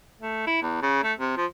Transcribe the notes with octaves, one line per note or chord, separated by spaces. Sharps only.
A3
E4
E2
C#3
A3
C3
F3